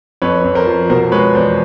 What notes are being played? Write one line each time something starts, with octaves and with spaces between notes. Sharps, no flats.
F2 B4 C#5
F2
A#4 C5
F3
B2 A#4 C5
G#3 B4 C#5
E2 C5 D5